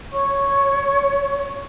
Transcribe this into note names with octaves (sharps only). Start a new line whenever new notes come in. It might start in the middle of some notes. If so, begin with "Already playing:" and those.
C#5 C#6